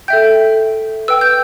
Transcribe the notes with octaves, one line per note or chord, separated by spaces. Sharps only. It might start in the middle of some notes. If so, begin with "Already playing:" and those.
A4 E5 G5 G6
B4 G5 E6
G6